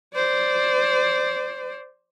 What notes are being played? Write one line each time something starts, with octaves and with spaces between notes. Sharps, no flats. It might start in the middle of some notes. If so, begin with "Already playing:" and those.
C5 D5